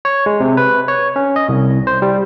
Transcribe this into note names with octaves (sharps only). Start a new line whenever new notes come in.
C#5
G#3
C3
B4
C#5
C#4
D#5
C2
C5
G3